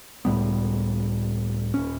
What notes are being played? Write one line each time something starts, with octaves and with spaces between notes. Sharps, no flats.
C#2 A2 G3 B3
D#1 C#4